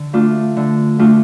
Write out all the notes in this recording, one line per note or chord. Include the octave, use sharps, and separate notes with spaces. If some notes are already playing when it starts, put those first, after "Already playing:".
Already playing: D3
A3 D4 F4
D3
A3 D4 F4